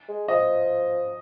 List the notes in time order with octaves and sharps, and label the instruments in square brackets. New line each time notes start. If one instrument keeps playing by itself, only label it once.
[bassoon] G#3
[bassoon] F3 [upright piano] D#5